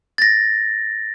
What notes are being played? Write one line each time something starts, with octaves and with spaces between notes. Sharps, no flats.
A6 A#6